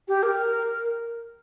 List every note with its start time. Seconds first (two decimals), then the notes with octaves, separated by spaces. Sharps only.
0.08 G4
0.23 A#4